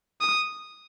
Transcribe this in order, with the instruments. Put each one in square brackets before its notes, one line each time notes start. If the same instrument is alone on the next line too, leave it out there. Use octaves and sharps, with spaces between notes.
[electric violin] D#6